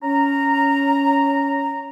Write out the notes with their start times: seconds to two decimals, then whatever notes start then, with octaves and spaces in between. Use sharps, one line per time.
0.02 C#4 A#5